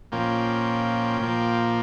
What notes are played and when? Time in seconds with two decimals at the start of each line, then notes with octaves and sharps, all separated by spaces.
0.12 A#2 F3 A#3 C#4 G5
1.21 A#2 F3 A#3